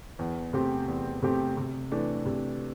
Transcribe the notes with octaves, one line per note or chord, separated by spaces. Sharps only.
E2
C3 A3 C4 G4
E2
C3 A3 C4 G4
C3
E3 A3 D4
C3